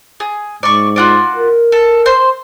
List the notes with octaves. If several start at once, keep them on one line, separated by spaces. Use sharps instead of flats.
G#4
G#2 D5 C#6
F4 F#4 D5
A#4
A4
C5 C6